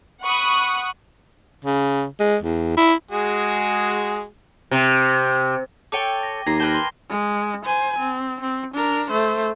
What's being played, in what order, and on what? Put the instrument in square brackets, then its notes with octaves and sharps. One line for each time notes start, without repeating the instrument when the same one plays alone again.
[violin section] F#5 B5 C#6 D#6 F#6
[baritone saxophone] C#3
G#3
E2
E4
[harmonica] G#3 F#4 G#4
[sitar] C3
[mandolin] A4 C#5 G5 [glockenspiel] D6 D#7 G7
[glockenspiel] A#6
[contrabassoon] D#2 [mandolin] A#5 [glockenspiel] G#6 A#6 C7
[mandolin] A#4 B4 G5 [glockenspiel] A5 G7
[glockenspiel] C6 G7
[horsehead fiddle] G#3
C5 G#5
C4
C4
D4 A#4
A3 C5